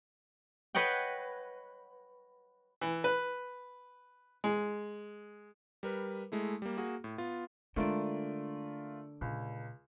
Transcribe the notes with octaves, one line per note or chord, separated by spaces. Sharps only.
B4 C#5 D#5 F#5 G5
E3
B4
G#3
G3 A#4 B4
G#3 A3 E4
G3 A#3
A#3 F#4 G#4
A2
B3 F4
D3 G#3 A3 D4 F4 A#4
C#2 A#2